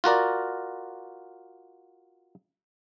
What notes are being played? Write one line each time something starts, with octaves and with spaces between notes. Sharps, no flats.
F4 F#4 A#4 D5